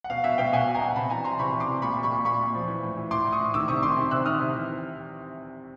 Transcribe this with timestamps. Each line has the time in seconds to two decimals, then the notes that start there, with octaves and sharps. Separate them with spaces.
0.04 F#5
0.10 B2 F5
0.24 B2 E5 F#5
0.38 B2 F5 G5
0.53 B2 F#5 G#5
0.68 B2
0.74 G#5 A#5
0.81 B2
0.96 C3 A5 B5
1.10 E3 G#5 A#5
1.24 E3 A#5 C6
1.39 C3 B5 C#6
1.53 E3
1.60 C6 D6
1.67 C3
1.82 A#2 B5 C#6
1.97 A#2
2.03 B5 C#6
2.11 A#2
2.25 A#2 B5 C#6
2.40 A#2
2.54 F3
2.68 E3
2.83 A2
2.97 E3
3.11 A2 C6 D6
3.26 A2
3.32 C#6 D#6
3.40 A2
3.54 D#3 D6 E6
3.68 C3 C#6 D#6
3.83 D#3 C6 D6
3.97 C3
4.11 C3 E6 F#6
4.25 D#3 D#6 F6
4.40 C3
4.55 E3